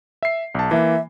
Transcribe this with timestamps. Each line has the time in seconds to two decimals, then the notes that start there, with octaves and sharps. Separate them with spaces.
0.23 E5 C7
0.55 B1 A5
0.71 E3 A#3 E5